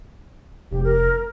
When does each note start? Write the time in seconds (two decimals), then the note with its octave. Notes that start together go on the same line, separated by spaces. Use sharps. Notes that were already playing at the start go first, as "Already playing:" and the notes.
0.71 F1 G4
0.84 A#4